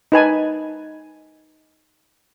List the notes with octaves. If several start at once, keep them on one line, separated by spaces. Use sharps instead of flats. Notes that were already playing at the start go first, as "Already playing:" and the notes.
D#4 B4 G#5 A5